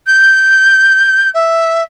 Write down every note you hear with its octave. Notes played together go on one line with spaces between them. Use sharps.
G6
E5